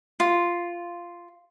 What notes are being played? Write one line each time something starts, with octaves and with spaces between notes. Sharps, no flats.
F4